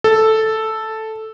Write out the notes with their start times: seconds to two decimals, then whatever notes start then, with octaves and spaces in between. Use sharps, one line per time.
0.04 A4